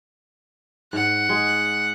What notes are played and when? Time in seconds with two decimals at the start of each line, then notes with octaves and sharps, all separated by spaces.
0.93 G#2 F#5
1.29 G#3